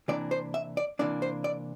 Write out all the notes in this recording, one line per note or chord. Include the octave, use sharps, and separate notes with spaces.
C3 E3 A#3 D4 D5
C5
E5
D5
C3 E3 A#3 D4 D5
C5
D5